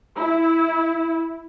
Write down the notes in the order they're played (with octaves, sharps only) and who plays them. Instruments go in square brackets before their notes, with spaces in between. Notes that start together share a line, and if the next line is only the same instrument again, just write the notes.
[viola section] E4